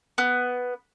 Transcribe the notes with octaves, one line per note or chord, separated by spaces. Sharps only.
B3